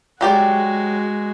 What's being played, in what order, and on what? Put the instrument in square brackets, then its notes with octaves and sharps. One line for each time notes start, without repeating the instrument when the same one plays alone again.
[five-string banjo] F#3 G4 D5 [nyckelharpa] G#3 F#4